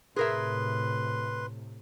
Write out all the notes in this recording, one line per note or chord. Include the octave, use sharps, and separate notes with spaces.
A2 C3 G#4 A#4 B4 E5 C6